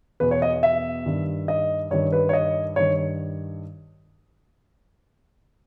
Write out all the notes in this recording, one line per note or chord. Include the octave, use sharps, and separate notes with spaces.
E2 B2 B4
C#5
D#5
E5
G2 D#3
D#5
G2 D#3 C#5
B4
C#5
D#5
G2 D#3 C#5